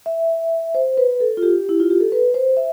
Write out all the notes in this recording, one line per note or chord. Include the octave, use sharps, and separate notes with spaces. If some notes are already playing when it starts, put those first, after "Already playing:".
E5
C5
B4
A4
F4
G4
E4
F4
G4
A4
B4
C5
E5